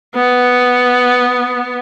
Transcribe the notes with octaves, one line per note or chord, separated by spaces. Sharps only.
B3